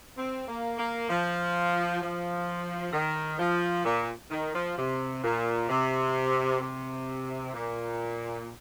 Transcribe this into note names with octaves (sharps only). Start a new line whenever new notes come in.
C4
A#3
A#3
F3
F3
D#3
F3
A#2
D#3
F3
C3
A#2
C3
C3
A#2